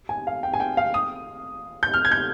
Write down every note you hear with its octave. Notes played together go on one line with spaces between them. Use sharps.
G#5
F5
G5
G#5
G5
F5
D#6
G6
F6
G#6
G6